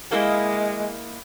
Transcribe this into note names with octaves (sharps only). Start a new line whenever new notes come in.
G#3 A#3 E4 A#4 D#5